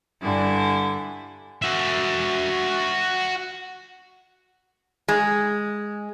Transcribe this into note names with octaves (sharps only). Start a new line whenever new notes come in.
G2 D3 E4 G#5
F#4 E5
G#3